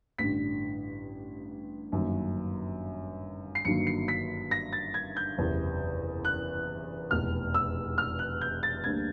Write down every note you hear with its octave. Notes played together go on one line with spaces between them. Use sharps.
A1 G2 D3 B6
G1 F#2 D#3 F#3 A#3
C7
G1 G2 D#3 F#3 A#3 C#7
C7
B6
A#6
A6
G#6
G6
F#1 E2 C3
F#6
F1 E2 B2 F6
E6
F6
F#6
G6
A6
D2 D3 G3 A#3 G#6